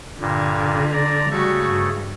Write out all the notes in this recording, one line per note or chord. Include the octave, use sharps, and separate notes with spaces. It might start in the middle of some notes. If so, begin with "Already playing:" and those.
G2 A#2 D3
D5 A#5
C#3 G3 A3 F#4
G2